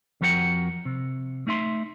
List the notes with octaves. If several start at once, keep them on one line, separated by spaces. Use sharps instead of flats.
F2 F3 F#4 A#4 F#5 G5
C3
A3 D#4 E5 C6